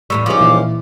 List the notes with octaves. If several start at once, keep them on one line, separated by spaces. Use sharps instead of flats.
E2 A2 G3 C#6 E6
C#2 F3 G3 D#4 D6
A#2 E3 E4